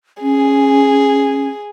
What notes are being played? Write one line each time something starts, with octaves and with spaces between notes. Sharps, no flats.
C#4 G#4